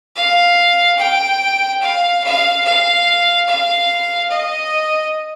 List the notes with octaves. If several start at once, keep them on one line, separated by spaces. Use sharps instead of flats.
F5
G5
F5
F5
F5
F5
D#5